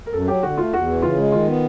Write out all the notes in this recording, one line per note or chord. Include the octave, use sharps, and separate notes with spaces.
A#4
F#2 A4
F#3 G4
D3 F#4
A3 F4
E2 F#4
E3
C#3 F4
G#3
D#3 F4
B3